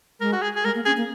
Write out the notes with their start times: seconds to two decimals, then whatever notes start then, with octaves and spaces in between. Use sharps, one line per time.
0.21 G#3 A#4
0.33 F#4
0.42 G#4
0.56 G#4
0.64 G#3 A#4
0.75 A#3
0.85 C#4 G#4
0.97 A#3